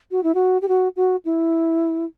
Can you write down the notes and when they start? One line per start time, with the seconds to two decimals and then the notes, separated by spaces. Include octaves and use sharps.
0.11 F#4
0.23 E4
0.34 F#4
0.62 G4
0.68 F#4
0.96 F#4
1.25 E4